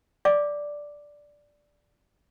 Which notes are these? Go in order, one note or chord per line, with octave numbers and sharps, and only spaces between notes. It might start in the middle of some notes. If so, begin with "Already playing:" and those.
D5 F5 D6